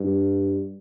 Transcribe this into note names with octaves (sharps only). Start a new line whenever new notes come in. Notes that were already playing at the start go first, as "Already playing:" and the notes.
Already playing: G2